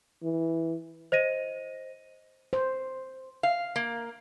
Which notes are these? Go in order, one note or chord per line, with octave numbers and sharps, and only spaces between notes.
E3
C5 D#5 A#6 D#7
C5
F5
A#3